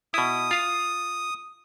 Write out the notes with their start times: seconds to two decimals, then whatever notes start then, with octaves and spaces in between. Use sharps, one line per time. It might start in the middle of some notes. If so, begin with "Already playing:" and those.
0.14 B2 E4 D#6
0.51 F4 F5